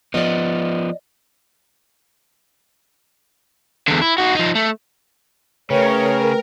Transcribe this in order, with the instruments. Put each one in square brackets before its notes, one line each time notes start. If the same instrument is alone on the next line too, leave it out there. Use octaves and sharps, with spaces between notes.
[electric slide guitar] F3 B3 [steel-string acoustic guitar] D5 D#5
[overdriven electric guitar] E2 D3
E4
D#4 F#4
F3 D#4
A3
[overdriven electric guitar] C#3 [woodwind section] E3 C#5 [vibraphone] A3 B4 G5 [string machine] A#4